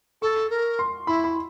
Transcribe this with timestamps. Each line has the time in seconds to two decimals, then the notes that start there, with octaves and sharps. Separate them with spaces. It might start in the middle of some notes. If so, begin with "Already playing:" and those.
0.22 A4 C#6
0.50 A#4
0.79 C6
1.07 E4 B5
1.24 B5